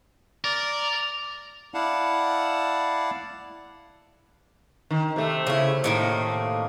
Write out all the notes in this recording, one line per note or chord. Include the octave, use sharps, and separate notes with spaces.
A#4 D5
E4 D5 F5 F#5 A5
D#3
C3 A3
C#3 E4
A2 D#3 A#3